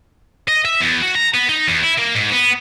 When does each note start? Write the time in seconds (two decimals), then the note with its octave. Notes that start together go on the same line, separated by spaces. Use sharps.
0.48 D#5
0.65 E5
0.81 E2
1.02 F#4
1.16 A#5
1.34 B3
1.49 D#4
1.68 E2
1.83 E4
1.98 A#3
2.14 G#2
2.32 B3